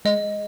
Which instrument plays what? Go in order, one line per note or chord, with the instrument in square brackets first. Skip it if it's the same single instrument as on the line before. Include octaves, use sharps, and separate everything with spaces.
[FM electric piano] G#3 [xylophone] D#5